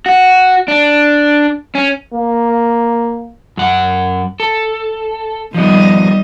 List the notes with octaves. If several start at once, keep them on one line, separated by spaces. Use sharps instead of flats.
F#4
D4
C#4
A#3
F#2 F#5
A4
D#3 F3 G3 B3 D#5